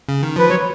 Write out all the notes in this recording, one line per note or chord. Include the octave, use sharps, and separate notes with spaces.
C#3
D#3
F3 B4
F#3 C#5